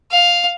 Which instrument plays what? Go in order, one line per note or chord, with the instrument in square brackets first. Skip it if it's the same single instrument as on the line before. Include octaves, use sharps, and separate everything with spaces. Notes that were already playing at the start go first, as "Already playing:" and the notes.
[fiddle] F5